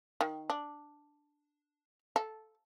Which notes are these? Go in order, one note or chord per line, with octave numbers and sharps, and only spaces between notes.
D#3
D4
A4